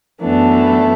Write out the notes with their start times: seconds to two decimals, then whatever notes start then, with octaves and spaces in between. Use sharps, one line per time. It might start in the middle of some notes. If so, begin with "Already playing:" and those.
0.22 F#2 E3 A3 B3 D4